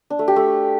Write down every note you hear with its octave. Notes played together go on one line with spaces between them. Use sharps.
D4
A3
G4
A3